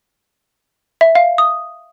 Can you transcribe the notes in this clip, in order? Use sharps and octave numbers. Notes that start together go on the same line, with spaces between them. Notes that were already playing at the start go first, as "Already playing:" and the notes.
E5
F5
D#6